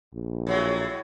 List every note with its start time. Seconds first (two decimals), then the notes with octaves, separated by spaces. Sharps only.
0.14 A#1
0.47 A2 F#3 G#3